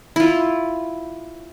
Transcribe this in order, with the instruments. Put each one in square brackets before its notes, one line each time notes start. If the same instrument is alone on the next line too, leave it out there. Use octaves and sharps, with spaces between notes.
[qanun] E4 F4